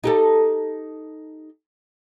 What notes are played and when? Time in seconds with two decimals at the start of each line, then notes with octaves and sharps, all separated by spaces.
0.04 D#4 G4 A4